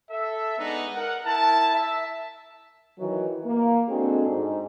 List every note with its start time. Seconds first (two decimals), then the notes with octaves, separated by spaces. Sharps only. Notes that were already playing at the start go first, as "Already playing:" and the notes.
0.11 A4 E5
0.58 G#3 B3 D4 D#4 F#5
0.95 A#4 F#5
1.25 E4 A#4 A5
1.74 E5
2.99 D#3 E3 F#3
3.45 A#3
3.88 G#3 C4 D4 F#4 G#4 A4
4.27 G#2